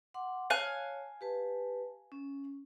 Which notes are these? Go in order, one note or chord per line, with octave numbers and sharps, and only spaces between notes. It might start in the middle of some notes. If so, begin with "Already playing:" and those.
F#5 C6 D6
C#5 F5 G#5 A5 F#6
G4 B4 A5
C#4